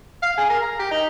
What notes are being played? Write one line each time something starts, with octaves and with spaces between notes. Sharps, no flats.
F5
G#4
A#4
A#5
G4
D#4